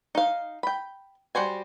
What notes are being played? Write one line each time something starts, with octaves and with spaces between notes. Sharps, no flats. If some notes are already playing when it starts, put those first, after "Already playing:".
D#4 F5
G5 B5
G3 F#4 C5 G#5